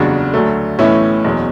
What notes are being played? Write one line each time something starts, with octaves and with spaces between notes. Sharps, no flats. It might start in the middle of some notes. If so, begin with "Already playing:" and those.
Already playing: F#1 E2 C#3 G3 D4 F#4
D2 D3 F#3 A3
B1 A2 E3 C#4 E4
F#1 E2 B2